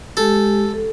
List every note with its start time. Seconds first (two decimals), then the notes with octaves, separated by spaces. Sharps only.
0.17 G#3 G4 A4
0.74 A4